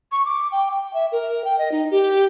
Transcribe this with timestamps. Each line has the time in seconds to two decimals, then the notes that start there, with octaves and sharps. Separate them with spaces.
0.12 C#6
0.26 D6
0.52 G5
0.71 G5
0.94 E5
1.12 A#4
1.45 G5
1.59 D#5
1.72 D#4
1.91 G4